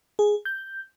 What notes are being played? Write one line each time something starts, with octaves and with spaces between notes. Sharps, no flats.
G#4
G6